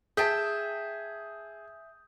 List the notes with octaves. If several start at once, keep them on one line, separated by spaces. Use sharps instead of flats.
G#4 E5 G5 A5 D#6 G6